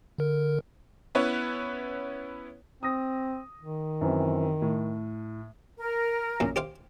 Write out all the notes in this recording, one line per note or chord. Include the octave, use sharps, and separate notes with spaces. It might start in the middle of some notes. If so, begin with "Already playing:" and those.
D3 A#4
B3 C#4 E4 B4 C#5
C4 D#6 A#6
D#3
F#2 E3 C4
A2
A#4
A#1 F#2
G4 C5 F5